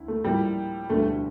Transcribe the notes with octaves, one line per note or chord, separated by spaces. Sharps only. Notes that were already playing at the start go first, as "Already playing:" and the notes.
Already playing: D2 D3 E4
A3
A2 F3 G3 A#3 E4
E1 D2 D3 G3 A3